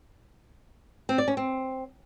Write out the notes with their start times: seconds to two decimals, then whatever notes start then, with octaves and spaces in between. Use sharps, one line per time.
1.09 C4
1.18 D5
1.28 C#4
1.37 C4